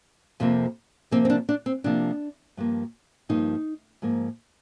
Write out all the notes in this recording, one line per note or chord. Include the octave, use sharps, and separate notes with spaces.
F2 C3 F3 A#3
C3 F3 A#3 C4
C4
D4
D4
C4
C3 F3 A#3 D4
G2 F3 A#3
G2 F3 A#3 D#4
G#2 F3 A#3